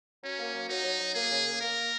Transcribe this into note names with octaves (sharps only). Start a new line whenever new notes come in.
F#3 C#4
A#3
F#3
F#3 D#4
F#3
F#3
A#3 G#4
C#3
A#3
A#3 A#4